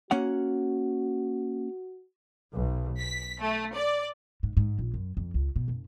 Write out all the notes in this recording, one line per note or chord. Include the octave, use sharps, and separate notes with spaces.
A#3 C#4 F#4 F#5
B1
B6
A3
D5
G#2
G#2
A#1
F#2
F2
C#2
B2
F#1